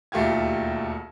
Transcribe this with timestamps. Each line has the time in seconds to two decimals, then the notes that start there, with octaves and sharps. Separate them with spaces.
0.12 E1 D#2 A3 F4 G4 G#6